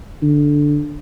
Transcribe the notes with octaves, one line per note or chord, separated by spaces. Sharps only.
D3